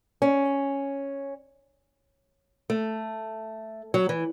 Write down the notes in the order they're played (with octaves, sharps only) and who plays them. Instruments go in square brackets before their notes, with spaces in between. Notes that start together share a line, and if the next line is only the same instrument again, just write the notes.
[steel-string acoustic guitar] C#4
A3
F#3
E3